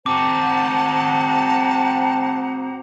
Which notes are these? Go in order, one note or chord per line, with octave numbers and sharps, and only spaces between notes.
C4 F#4 C5 F#5 A5 A#5 D6